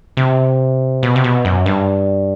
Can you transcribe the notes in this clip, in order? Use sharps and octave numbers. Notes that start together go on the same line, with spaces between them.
C3
B2
C3
B2
F#2
G2